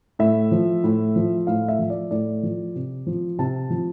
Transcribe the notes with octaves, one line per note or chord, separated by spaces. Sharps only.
A2 E5
F3
A2
F3
A2 F5
E5
F3
D5
A2 D5
F3
C3
F3
C3 A5
F3